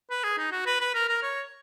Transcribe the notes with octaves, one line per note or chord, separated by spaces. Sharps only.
B4
G#4
D#4
F#4
B4
B4
A#4
A#4
C#5